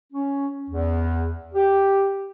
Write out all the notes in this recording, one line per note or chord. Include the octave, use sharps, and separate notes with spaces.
C#4
E2
G4